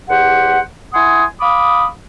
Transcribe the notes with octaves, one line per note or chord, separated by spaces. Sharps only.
E2 G4 C5 F#5
E4 F#5 G#5 C6 D#6
F5 B5 D6 D#6